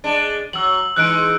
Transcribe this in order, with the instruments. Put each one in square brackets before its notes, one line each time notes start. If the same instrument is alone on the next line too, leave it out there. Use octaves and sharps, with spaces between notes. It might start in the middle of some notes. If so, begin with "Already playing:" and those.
[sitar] G#3 D4
[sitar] F#3 [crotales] E6 F#7
[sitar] E3 G#3 D#4 [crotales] F#6 C#7 D7